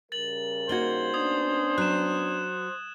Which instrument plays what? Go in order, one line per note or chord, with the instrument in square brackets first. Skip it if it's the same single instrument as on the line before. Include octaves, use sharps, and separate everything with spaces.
[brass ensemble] C#3 G3 A#4 [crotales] A6 F#7
[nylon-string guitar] A#3 D#4 F#4 [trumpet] C5 [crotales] G#6 A6 G7
[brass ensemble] B3 C#4 D4 [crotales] D#6 G#6
[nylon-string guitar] F#3 [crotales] F#6 E7